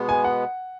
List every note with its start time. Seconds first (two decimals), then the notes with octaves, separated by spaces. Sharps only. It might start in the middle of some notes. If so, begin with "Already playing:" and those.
Already playing: B2 G#3 B3
0.09 G#5
0.24 F#5